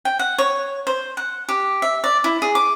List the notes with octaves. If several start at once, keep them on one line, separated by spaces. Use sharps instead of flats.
G5
F#5
C#5
C5
F#5
G4
E5
D5
E4
G#4
D6